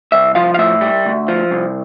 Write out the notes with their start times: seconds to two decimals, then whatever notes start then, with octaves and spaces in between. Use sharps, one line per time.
0.12 C2 E5
0.35 F3 F5
0.54 F5
0.58 A2 E5
0.81 G3
1.05 D2
1.28 F3
1.51 C2